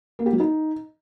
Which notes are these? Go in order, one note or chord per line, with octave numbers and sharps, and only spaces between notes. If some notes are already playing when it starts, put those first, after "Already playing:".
A#3
G4
F#3
D#4